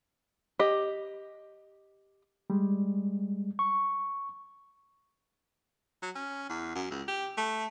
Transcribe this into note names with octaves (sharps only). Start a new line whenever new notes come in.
G4 D#5
G3 G#3
C#6
F#3
C#4
E2
F#2
C#2
G4
A3